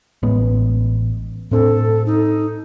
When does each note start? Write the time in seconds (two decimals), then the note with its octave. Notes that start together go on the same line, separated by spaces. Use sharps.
0.23 A1 G#3 B3
1.51 A2 C4 D4 A4
2.06 D#4